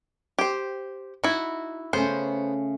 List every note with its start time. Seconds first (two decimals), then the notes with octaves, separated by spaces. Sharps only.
0.39 G4 C5
1.24 D#4 E4 F#4
1.93 C#3 A3 B3 C#4 C5